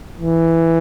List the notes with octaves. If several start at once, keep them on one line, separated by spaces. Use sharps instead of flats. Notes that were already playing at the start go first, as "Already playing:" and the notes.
E3